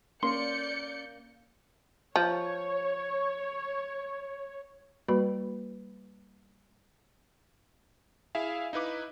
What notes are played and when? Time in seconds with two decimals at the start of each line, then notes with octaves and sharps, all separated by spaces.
0.23 A#3 C#4 D5 C6 G6 C#7
2.16 F3 C#5
5.08 G3 A#3 F#4 B4 B5
8.35 E4 G#4 E5 F5
8.73 D#4 E4 B4 D6